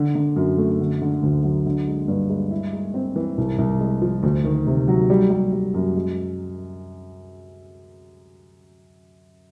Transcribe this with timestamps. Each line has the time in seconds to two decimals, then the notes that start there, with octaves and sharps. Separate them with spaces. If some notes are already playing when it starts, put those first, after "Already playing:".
Already playing: D3
0.15 D3
0.36 F#2
0.58 A3
0.80 D3
1.02 D3
1.23 D2
1.44 F#3
1.66 D3
1.87 G#3
2.08 G2
2.29 G#3
2.51 E4
2.73 G#3
2.94 C4
3.16 E3
3.38 C2
3.58 C2
3.80 G#3
4.02 F3
4.23 D2
4.44 D#3
4.67 C3
4.88 F#3
5.10 G3
5.30 G3
5.52 G3
5.74 F#2
5.95 G#3